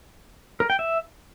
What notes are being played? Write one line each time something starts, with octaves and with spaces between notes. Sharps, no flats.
A#4
G5
E5